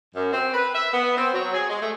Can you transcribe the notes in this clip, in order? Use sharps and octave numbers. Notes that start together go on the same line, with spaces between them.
F#2
C4
B4
E5
B3
C4
F#3
G#4
G#3
A3